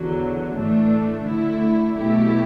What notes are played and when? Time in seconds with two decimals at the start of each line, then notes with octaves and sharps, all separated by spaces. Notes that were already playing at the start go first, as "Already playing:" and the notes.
Already playing: E2 D3 F#3
0.55 A2 E3 A3 D4
1.26 D3 A3 E4
1.97 B2 F#3 A3 E4 G4